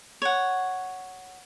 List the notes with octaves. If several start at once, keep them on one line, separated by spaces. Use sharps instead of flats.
C#5 F#5